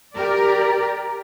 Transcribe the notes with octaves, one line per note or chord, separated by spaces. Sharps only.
G4 A#4 D5